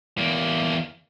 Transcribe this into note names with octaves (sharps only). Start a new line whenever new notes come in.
E2 A#3